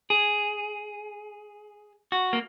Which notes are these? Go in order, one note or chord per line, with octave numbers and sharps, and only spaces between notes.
G#4
F#4
A#3